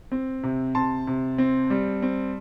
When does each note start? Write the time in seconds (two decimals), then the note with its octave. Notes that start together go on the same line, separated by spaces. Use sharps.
0.12 C4
0.43 C3
0.75 C3 A5 C6
1.07 C3
1.38 C4
1.70 G3
2.02 C4